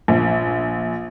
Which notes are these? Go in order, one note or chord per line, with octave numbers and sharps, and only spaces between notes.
A#1